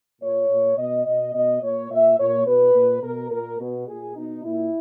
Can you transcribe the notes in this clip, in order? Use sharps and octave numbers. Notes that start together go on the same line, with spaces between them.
A#2 C#5
A#2
B2 D#5
B2 D#5
B2 D#5
A#2 C#5
A#2 E5
A#2 C#5
B2 B4
A#2
B2 A#4
A#2 A#4
B2
A#2 G#4
B2 D#4
A#2 E4